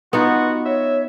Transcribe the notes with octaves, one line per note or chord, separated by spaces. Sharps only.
B3 D#4 F4 F#4
C#5 E5